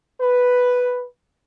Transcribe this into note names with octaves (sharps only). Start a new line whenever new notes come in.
B4